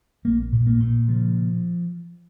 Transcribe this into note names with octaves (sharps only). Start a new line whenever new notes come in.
A#1 A#3
A#2
A#3
A#2
C#3 F3